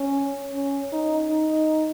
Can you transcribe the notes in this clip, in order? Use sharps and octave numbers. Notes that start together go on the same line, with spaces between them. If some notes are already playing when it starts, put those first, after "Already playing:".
Already playing: C#4
C#4
D#4
D#4